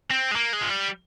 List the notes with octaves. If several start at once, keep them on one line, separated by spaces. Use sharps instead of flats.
C4
G#3
A#3
G#3
F3
G3